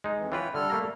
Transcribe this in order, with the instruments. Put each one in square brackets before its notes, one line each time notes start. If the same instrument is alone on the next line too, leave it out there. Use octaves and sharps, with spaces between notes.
[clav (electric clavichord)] G#3 D#4
[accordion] F2 E3
[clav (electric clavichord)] E3 F4 B4 [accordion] C#5 G5
[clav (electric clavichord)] D3 [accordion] G3 A4 F6
[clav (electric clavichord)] A3 A#3 A#5